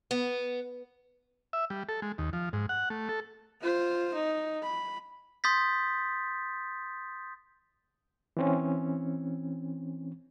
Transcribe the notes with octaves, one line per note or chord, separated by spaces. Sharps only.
B3
E5
G3
A4
G#3
D#2
F3
G#2
F#5
A3
A4
F4 C5
D#4
B5
C6 D#6 G6 A6 B6
E3 C4 C#4